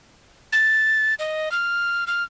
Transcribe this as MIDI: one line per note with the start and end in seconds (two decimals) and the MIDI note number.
0.52 1.14 93
1.19 1.52 75
1.52 2.04 89
2.07 2.23 89